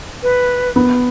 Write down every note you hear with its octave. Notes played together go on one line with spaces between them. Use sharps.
B4
B3